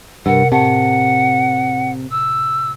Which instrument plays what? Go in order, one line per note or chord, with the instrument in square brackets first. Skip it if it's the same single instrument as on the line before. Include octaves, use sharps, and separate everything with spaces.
[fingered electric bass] G2 [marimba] C3 A#4 [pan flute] F#5
[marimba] A2 A5 [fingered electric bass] C3 [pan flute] F#5
[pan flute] E6